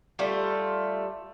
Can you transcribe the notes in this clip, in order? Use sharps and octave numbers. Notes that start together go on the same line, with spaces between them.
G3 A3 F4